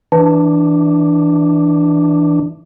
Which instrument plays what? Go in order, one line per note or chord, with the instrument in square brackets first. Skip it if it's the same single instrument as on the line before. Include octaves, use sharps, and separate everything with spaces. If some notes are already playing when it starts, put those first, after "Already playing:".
[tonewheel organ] E3 D4